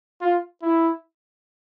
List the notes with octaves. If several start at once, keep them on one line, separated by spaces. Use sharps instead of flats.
F4
E4